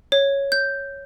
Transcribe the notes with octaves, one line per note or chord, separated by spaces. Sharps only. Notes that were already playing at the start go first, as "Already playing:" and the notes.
C#5
G6